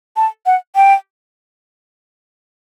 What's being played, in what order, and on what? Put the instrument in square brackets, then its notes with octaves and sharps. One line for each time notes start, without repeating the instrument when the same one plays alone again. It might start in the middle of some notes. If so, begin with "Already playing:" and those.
[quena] A5
F#5
G5